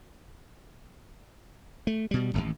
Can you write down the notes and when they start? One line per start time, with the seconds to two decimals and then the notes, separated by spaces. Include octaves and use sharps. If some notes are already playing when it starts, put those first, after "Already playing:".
1.87 A3
2.11 B2 G3
2.34 D#1 A1 D#2